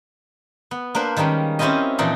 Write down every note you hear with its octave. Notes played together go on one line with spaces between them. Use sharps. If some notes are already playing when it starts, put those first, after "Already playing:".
B3
A#3 D4 B4 C5
D#3 G3 G#3 A#3 C#4
C4 C#4 E4 F4 G4 D#5
A#2 E3 F3 D#4 A4 D5